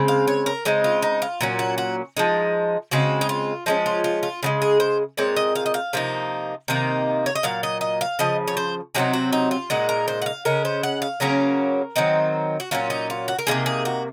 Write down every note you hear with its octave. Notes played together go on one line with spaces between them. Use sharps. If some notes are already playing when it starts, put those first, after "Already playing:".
Already playing: C#3 G#3 C4
F5
C#5
A#4
C#3 G#3 C4 D#4
F4
D#4
F4
A#2 F#3 C#4
F#4
F#4
F3 G#3 D#4
C#3 G#3 C4 F#4
D#4
F4
F3 G#3 C#4 D#4
F4
F4
F4
C#3 F3 G#3
G#4
C5
A#2 G#3 C4 C#5
D#5
F5
D#5
F5
C3 F3 A#3 D#4
C3 D#3 A#3 D#4
C#5
D#5
A#2 F#3 F5
D#5
D#5
F5
C#3 F3 D#5
C#5
C5
C3 F#3 C4 D#4 G#4
F#4
D#4
F4
A#2 G#3 D#4 F#4
A#4
C5
F#5
F5
C#3 G#3 C#4 A#4
C5
F#5
F5
C#3 F#3 A#3 C#4 A#4
D#3 F#3 C4 D#4
F#4
A#2 F#3 C#4 F4
D#4
F4
F#4
A#4
C3 F#3 A#3 D#4 G#4
G#4
F#4